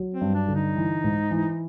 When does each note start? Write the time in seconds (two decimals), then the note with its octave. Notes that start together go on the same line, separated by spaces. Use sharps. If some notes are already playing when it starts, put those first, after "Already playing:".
Already playing: F#3
0.14 C4
0.21 G2
0.34 D4
0.48 D3
0.55 D#4
0.76 E3
1.04 G#2
1.31 E3